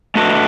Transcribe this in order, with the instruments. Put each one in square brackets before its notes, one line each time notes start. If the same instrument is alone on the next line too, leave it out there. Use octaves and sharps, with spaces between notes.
[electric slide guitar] A3 D4 F#4 B4 D#5